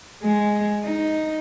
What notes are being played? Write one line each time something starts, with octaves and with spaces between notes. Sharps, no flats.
G#3
D#4